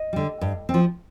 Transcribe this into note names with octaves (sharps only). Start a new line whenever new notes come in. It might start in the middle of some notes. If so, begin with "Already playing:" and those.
Already playing: D#5
D3 G3
G2
C4
F3